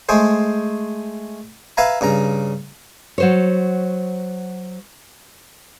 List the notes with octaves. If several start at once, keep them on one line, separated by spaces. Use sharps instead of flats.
G#3 A3 G#4 C5
B4 E5 F5 G#5 A#5
G2 C#3 A#5
F#3 C5 C#5